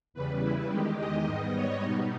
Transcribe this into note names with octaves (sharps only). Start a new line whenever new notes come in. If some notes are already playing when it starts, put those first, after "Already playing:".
E2 C#3 G3 B4
E4
E2 D#3 G#3 G4
D#5
G#2 G3 B3
C#5
B2 G3 B3 D#4